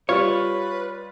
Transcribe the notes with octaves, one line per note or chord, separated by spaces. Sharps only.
G3 F4 B4 C#5